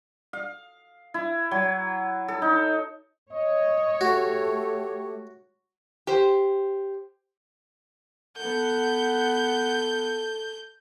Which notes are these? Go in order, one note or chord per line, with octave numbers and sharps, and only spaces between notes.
F5
E4
F#3
A4
D#4
C#5 D#5
A3 F#4 G4
G4 C5
B3 A4 F#5 G6